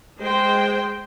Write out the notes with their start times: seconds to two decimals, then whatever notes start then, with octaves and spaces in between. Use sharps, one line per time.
0.20 G#3 C5 G5